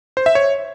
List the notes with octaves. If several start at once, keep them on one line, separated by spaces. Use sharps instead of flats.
C5
E5
C#5